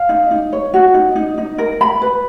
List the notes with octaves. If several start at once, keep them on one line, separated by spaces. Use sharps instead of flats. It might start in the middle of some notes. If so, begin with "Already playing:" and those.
Already playing: F5
D#4
D#4
C#5
F#4
D#4
D#4
D#4
A#4
B5
B4